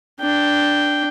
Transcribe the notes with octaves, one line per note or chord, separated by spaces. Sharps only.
D4 G5